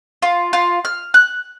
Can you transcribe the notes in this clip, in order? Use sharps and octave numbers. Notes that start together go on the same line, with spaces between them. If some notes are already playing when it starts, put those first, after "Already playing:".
F4
F4
F6
F#6